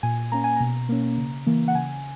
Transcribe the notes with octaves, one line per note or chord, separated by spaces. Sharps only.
A#2 G#5
A#3 C#4 A#5
G#5
B2 A#5
A#3 C#4
C#3
E3 A#3
F#5
C#3 G#5